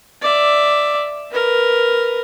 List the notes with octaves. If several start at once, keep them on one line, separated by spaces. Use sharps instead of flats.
D5 E5
A#4 B4